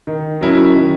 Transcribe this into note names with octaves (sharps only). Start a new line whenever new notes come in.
D#3
F#3 C#4 E4 A#4
D#3